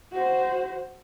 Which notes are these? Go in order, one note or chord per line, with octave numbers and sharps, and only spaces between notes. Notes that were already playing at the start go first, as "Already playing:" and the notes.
F#4 C5